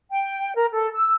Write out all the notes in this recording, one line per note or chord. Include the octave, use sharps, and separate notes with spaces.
G5
A#4
A4
E6